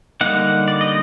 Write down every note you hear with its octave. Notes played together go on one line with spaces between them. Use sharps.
D3 G3 A#3 D#4 F#5
D5
D#5